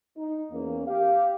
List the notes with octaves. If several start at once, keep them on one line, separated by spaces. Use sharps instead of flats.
D#4
E2 A#3 C#4
G4 F5